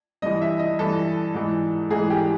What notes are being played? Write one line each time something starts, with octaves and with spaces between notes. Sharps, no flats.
G2 E3 D#5
E5
D#5
G2 E3 A4
G#2 E3
G#2 E3 G#4
G4